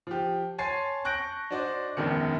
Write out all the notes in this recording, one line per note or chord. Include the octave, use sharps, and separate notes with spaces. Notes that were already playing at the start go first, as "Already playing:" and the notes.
F3 G4
C#5 G#5 A5 C6 A6 C7
A5 C#6 F#6 G6 A#6 D7
D4 F#4 C5 D5 D#5
E1 A#1 F#2 B2 D#3 C#7